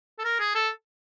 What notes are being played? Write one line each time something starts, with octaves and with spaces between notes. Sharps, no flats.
A4
A#4
G#4
A4